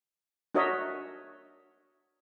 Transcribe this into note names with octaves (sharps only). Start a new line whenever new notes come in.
D4 F#4 A#4 C#5 D#5 E5